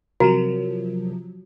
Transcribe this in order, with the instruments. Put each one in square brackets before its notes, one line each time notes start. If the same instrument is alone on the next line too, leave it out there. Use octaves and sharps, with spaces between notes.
[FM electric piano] C3 F3 F#3 [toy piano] F#4 [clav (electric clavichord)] A#4